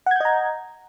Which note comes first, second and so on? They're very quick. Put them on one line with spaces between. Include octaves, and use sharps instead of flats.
F#5 G#6 G6 D#5 A#5